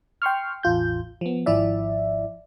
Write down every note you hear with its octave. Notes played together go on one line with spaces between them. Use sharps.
G5 C6 C#6 F6
A1 E2 F4 G6
F3 B3
G#1 F3 E4 D5 E5